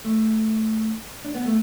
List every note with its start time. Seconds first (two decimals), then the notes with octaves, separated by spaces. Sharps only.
0.05 A3
1.25 D4
1.35 B3
1.46 A3